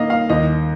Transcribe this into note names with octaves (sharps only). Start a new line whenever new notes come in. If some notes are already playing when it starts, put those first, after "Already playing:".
Already playing: D#3 A#3 D#5 F5
F5
D#2 D#5